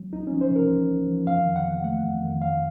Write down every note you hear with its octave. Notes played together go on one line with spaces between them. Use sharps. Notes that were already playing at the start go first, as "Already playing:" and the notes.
Already playing: F#3
C2 D#4
F3 C#4
C5
C3 A#4
C2
C2
F3
F2 F5
D#3
F#5
C3
A3 F#5
F2
D#3
F2 F5